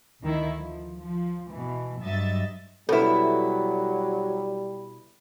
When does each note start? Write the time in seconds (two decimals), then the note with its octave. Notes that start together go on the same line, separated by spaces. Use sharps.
0.22 D2 D#3 E4
0.58 F3
1.02 F3
1.51 B2 E3
2.01 G2 F#3 D#5 E5 A6
2.89 B2 F#3 G3 E4 A4 B4